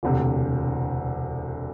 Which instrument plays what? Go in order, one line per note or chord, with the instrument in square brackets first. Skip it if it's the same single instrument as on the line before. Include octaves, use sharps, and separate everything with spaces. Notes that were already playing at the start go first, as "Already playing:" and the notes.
[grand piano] E1 D2 C3